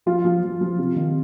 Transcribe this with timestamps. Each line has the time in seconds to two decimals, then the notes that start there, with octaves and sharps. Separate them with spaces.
0.06 F3 F4
0.25 F3
0.43 F3
0.61 F3
0.79 C3
0.96 D#3